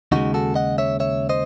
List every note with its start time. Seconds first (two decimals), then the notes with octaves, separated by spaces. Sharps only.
0.12 D#2 C#3 G#3 D#4 F#4
0.34 F#4 A4
0.55 D#5 F#5
0.78 C#5 E5
1.00 C#5 E5
1.29 C5 D#5